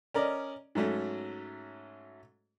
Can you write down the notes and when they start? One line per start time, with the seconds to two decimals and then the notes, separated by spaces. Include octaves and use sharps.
0.14 C#4 A#4 D5 D#5
0.75 G#2 F#3 A3 C#4